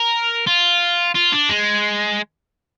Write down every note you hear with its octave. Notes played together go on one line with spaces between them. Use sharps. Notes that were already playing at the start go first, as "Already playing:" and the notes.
Already playing: A#4
F4
F4
D4
G#3